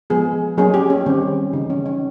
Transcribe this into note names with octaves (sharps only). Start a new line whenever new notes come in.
F3 G#3 B3 G#4
F#3 A#3 C#4 G#4
G4
C#4
D#3 G3 C4
C#3 E3 G3 D#4
C#4
C#4